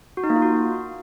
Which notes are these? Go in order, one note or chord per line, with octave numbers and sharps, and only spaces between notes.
F#4
D#4
A#3
F4
F#4